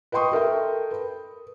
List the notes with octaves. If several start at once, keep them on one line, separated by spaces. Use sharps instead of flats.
B4 D#5 G5 C6 C#6 D#6
A4 A#4 E5 G5
B4